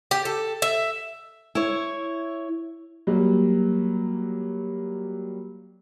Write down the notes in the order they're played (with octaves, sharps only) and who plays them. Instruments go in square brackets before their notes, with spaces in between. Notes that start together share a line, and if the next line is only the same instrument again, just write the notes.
[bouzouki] G4
A4
E5
[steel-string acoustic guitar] E4 C#5
[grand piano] F#3 G3 A#3